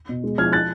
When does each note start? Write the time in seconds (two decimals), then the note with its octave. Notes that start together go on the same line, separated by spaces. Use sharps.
0.09 B2
0.24 G#3
0.38 F3 F6 G#6
0.52 F3 F#6 A6